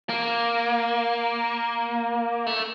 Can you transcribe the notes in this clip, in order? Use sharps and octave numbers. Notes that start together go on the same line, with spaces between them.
A#3
A3